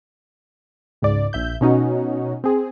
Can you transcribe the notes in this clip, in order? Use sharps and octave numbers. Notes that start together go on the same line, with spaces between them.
C#2 G#2 D5
A#1 E5 G6
B2 C#4 D#4 F#4
C4 G#4